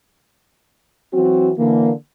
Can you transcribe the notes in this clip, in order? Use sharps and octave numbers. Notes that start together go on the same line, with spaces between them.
E3 F#3 C4 F#4
D3 E3 A#3